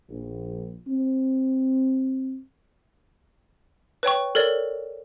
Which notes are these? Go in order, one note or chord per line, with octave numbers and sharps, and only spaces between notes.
A#1
C4
B4 C#5 G5 C#6
A4 A#4 C#5 D5